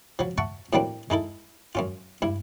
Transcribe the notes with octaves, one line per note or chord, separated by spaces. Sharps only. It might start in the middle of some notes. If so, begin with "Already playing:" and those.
F3 F#3
E5 F#5 A5 C#6
A2 F#3 G3 A#3 C4 D4
G#3 D#4 E4 A4
F#2 C#4 F4
G2 E4